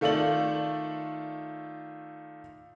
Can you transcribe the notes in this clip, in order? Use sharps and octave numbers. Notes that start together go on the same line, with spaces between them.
D#3 A3 F4 A4 D5 F#7